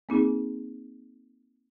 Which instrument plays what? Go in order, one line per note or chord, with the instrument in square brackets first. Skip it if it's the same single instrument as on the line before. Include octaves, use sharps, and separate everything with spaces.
[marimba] A#3 C4 D#4 G#4